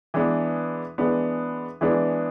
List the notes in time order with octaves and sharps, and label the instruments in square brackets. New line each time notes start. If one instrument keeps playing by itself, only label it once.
[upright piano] E3 G#3 B3 D4
E3 G#3 B3 D4
E3 G#3 B3 D4